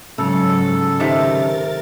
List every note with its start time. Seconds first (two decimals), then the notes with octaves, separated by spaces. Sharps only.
0.18 G#2 C#3 F#3 A4
1.00 C3 D#3 A3 A#4 A6